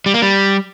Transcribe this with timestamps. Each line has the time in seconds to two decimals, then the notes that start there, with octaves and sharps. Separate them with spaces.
0.06 G3
0.14 A#3
0.22 G3